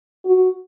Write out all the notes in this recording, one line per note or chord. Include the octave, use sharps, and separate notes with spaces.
F#4